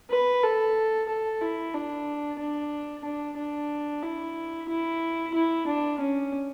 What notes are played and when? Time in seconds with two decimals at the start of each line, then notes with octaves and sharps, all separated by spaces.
0.11 B4
0.43 A4
1.09 A4
1.41 E4
1.74 D4
2.39 D4
3.05 D4
3.37 D4
4.03 E4
4.69 E4
5.35 E4
5.67 D4
6.00 C#4